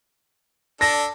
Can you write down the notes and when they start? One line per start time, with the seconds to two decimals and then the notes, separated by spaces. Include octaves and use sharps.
0.81 D4 A4 A#6